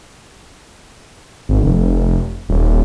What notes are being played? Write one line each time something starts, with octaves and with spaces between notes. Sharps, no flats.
G#1
F1
D#1